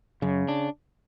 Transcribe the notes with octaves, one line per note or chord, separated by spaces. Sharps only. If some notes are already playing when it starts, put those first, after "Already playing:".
F#2 C#3
D4